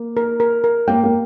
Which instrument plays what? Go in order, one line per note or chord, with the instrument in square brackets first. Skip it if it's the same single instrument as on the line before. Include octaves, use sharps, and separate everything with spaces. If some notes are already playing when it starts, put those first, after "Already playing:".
Already playing: [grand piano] A#3
[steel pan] A#4
A#4
A#4
[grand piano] A#3 [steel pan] G5
[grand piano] A#3